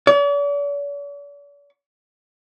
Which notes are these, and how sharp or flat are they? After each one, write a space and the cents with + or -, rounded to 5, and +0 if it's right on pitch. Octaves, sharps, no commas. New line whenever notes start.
D5 -45